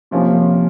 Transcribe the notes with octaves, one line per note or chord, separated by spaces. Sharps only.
C3 F3 A#3 C#4